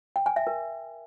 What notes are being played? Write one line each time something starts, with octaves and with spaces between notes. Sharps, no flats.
G5
G#5
E5
A#4